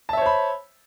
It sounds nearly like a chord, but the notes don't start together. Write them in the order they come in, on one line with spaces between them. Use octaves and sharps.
A5 E5 C#5 C5 B5